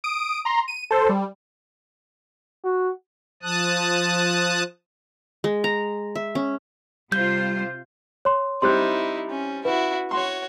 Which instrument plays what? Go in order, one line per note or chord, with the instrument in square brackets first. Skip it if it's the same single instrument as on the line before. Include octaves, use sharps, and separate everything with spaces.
[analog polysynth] D#6 D7
A#5 C6
D#7
A4 C5
G3
[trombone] F#4
[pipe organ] F3 A5 D#6 F#6
[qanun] G#3
A#5
E5
C#4
[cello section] C3 F4 C5 [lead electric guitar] G3 [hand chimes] G6
[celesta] C#5 C6
[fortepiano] G3 C4 [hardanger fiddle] D#4 E4 [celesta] C6 F#6
[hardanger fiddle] C#4
[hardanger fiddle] E4 F#4 [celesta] B4
[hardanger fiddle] F#4 C#5 [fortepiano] C6